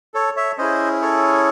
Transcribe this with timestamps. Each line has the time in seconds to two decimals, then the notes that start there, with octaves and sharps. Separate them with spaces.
0.14 A4 C#5
0.36 C#5 E5
0.58 C#4 E4 G#4 C5 D#5
1.02 A4 C#5